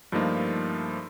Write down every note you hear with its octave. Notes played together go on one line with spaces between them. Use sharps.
G2 F3 A3 A#3 D#4 F4